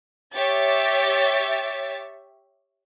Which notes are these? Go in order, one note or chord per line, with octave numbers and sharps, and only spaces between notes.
G4 C#5 E5 A6